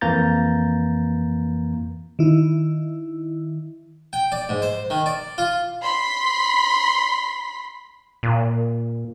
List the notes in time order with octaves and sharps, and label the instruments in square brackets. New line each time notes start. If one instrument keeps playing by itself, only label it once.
[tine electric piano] F2 E3 A#3 A#5 G6 A6
[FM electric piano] D#3 E4
[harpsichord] G5
D5
G#2
C5
D#3
D5
F4
[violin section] B5 C6 B6
[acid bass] A#2